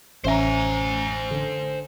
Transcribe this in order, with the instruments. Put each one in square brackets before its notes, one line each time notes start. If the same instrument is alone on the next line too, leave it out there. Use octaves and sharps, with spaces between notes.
[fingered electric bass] A1 [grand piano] C#4 E5 A#5 [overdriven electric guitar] C5 G#5
[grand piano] D3